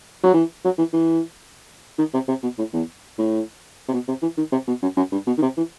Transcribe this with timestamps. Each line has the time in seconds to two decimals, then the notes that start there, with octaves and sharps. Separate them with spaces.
0.23 F#3
0.34 E3
0.64 F#3
0.78 E3
0.93 E3
1.98 D#3
2.13 C3
2.28 C3
2.43 B2
2.58 A2
2.73 E2
3.18 A2
3.88 C3
3.93 B2
4.08 C3
4.22 E3
4.37 D#3
4.52 C3
4.68 B2
4.82 F#2
4.97 F#2
5.12 G2
5.27 B2
5.38 D#3
5.42 C3
5.57 E3